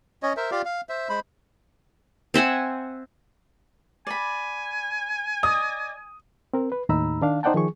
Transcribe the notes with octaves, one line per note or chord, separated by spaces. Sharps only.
C#4 C#5 D#5
A#4 C5 E5
F4 G4 D5 F5
F5
C5 E5
G#3 C5 B5
C4 E5 F#5 G#5
D5 G#5 B5
D5 D#5 D#6
C4 A#4
B4
D#2 A2 D#4 A#5 B5 E6
D#3 D4 F5
D#4 C5 D5 F#5 G5 A5
D#3 F3 G#4 C#6